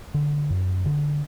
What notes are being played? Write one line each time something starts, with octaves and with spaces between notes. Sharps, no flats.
D3
F#2
D3